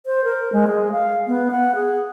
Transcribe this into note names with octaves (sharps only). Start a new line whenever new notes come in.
C5
A#4
G#3
G#4
F5
B3
F#5
G#4